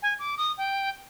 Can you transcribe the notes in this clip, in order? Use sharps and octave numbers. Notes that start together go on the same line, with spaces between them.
G#5
D6
D#6
G5